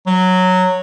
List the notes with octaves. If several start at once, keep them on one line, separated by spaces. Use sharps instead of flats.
F#3